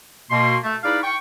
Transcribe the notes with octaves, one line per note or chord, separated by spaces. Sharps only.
B2 A#3 C6
A3
D#4 E4 G#4 B4 D5 F5
G5 C#6